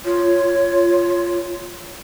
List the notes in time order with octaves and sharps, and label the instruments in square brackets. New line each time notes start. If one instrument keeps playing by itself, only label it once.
[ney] F4 [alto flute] C#5